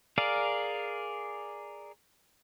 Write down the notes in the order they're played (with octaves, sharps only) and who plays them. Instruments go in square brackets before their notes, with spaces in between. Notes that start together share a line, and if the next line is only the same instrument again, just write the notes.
[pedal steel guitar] G#4 A#4 D5 F5